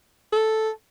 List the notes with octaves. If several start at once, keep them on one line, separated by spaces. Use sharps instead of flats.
A4